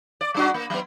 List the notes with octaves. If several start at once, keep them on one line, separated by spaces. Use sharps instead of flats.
D5
G3 D4 F#4
A#3
F#3 B3